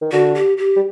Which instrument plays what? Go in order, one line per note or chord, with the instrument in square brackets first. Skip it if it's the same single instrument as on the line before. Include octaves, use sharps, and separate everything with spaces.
[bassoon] D#3
[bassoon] D3 [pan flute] F#4
[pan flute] G4
G4
[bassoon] G3